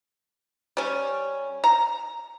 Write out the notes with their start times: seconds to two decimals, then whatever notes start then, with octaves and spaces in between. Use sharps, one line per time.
0.77 G3 C#4
1.64 A#5